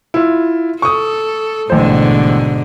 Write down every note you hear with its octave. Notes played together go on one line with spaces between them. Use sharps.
E4 F4
A4 C#6 D#6
A1 G#2 B2 D3 C5